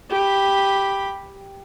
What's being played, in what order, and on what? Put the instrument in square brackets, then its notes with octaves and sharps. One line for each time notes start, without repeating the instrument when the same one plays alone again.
[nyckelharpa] G4 B5